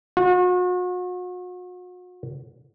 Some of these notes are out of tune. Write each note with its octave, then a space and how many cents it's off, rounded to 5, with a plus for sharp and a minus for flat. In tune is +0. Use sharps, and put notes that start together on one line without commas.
F#4 -40